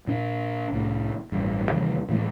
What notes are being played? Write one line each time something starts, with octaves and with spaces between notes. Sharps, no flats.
A#2 D4
C2 A2
A1 G2
D#2 C3 E3 G3
A2 E3 F#3 G#3